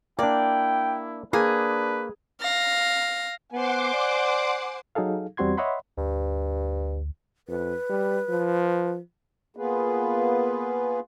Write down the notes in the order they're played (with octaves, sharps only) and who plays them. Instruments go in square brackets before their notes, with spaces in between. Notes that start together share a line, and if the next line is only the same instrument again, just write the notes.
[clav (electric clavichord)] A#3 D4 [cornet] E4 [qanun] D5 [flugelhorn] G5
[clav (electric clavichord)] A#3 [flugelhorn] D4 [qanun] G#4 [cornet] B4
[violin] F5 A#6
[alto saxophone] B3 [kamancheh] C5 G#5 [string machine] F#5 C6 D6
[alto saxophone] D5
[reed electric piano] F#3 D#4 G#4 A4 F5
E2 G3 C4 F#4 C6 G#6
C#5 D#5 E5 F#5 B5 C6
[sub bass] D2 [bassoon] G2
[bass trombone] F2 [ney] B4
[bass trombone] G3
F3
[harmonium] A#3 B3 F4 G#4 B4